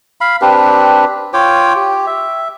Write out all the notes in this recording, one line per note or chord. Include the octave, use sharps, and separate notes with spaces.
F5 B5
C4 D4 G4 B4
F4 C#5 G5 D6
G4
E5